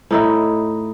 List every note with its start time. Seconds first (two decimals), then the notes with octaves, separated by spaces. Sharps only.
0.11 A2 D#4 E4